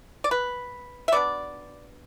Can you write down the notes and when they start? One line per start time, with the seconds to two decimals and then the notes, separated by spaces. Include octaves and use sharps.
0.24 D5
0.31 B4
1.08 E5
1.12 B2 B3 D4 D5